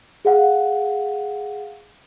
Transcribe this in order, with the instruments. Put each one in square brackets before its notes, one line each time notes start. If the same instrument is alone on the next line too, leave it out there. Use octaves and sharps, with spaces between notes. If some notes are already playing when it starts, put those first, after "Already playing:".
[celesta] G#4 F5 F#5